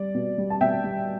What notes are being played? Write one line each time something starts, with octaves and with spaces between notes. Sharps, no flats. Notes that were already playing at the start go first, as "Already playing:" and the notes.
Already playing: G3 D5
B2
G3
A5
B2 E5 G5
G3